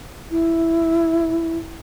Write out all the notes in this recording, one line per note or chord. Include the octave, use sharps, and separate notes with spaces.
E4